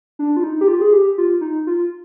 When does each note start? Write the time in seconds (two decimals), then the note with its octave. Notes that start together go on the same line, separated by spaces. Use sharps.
0.19 D4
0.37 F4
0.43 D#4
0.61 G4
0.68 F4
0.81 G#4
0.93 G4
1.18 F4
1.41 D#4
1.67 F4